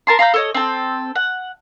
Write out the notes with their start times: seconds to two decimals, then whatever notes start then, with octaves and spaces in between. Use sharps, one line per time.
0.07 A#4 A5 C6
0.19 F5 A#5 B5 G6
0.34 A4 C#5 D#5
0.54 C4 A4
1.16 F#5